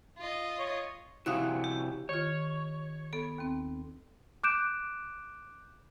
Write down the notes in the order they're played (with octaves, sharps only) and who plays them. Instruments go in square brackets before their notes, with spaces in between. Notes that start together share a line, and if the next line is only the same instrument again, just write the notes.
[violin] F4 D#5
[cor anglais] C#5
[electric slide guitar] C3 E4 F#4 [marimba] F5 D#6 F#6
[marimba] G4
[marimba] D#3 F4 [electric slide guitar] C#5
[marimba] B3 A4
D#2 C4
[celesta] D6 F#6 G6 D7 E7